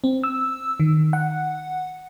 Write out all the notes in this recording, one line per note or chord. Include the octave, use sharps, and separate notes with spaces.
C4
E6
D#3
F#5